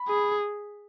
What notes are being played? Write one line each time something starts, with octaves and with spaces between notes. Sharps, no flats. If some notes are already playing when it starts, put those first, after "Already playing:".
Already playing: B5
G#4